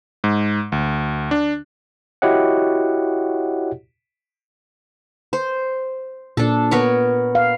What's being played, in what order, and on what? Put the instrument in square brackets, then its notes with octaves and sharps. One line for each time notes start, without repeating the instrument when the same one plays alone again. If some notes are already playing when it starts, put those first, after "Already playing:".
[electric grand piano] G#2
D2
D4
[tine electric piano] E4 F#4 G4 C#5 D#5 F#5
[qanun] C5
[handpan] A#2 [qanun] D4 A4
[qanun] B3 A#4 C#5
[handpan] F5